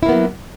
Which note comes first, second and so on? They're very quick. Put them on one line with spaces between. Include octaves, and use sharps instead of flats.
E4 A#3 B3 F#3